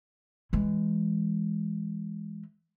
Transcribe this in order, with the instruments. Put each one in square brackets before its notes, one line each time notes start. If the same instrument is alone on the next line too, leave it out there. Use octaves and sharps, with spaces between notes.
[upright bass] E3 G#3